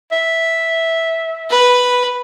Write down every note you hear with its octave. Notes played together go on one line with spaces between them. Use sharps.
E5
B4